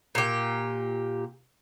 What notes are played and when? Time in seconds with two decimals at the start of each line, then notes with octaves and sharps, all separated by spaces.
0.15 A#2 G4